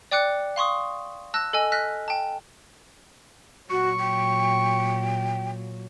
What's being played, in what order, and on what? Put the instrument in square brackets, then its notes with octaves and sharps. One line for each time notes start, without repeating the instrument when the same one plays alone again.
[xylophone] D5 G5 D6 F#6 C#7
F5 C6 C#6 D#6
A5 E6 F#6 A#6
A4 D#5 G#5
F6 F#6 A#6 B6
G5 A5
[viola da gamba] A#2 F#3 [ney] F#4 [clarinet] C#6
[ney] G5